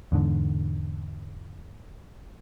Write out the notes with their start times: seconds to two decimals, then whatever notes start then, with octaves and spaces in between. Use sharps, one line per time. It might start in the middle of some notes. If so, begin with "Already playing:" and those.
0.12 E2 G#2 D3